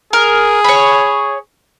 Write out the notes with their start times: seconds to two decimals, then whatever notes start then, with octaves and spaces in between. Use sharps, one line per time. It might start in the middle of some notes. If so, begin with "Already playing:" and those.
0.13 G#4 A#4
0.64 C#5 B5